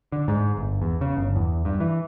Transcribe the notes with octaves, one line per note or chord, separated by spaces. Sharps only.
D3
G#2
G1
E2
C#3
G1
E2
G2
E3